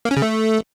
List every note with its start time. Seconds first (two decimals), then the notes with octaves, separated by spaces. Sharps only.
0.05 A#3
0.11 C#4
0.17 C#3
0.22 A3